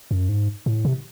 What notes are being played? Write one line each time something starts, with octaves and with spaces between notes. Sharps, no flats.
F#2
G#2
A2
C3